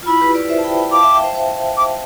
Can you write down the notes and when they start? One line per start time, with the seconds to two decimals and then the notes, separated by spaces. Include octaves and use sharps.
0.03 F4
0.07 E4 B5
0.21 G4 B4
0.35 B4 D5
0.49 C5 E5
0.58 A5
0.64 G5 B5
0.77 G5 B5
0.92 F5 A5 D6
1.03 E5 G5
1.14 E5 G5
1.24 C5 E5
1.35 C5 E5
1.77 D6